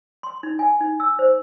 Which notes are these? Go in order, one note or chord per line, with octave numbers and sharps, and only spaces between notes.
C6
D#4
G#5
D#4
E6
C5